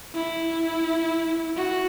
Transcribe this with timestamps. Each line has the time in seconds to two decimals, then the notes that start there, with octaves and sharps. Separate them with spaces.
0.15 E4
1.56 F#4